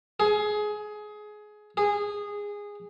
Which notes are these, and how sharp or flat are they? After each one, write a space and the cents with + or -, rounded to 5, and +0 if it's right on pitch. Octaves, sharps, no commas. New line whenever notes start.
G#4 +20
G#4 -15